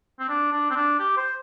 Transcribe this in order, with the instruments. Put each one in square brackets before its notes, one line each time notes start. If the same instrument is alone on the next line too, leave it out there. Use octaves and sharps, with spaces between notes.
[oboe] C4
D4
D4
C4
D4
G4
C5